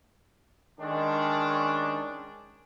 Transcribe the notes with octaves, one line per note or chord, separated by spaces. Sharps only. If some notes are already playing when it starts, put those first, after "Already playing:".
D#3 G#3 C#4 D4